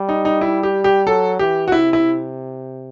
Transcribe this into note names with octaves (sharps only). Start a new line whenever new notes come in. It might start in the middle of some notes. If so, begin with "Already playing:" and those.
Already playing: G3
D#4
D#4
E4
G4
G4
F#3 A4
E3 G4
F#4
C3 E4
E4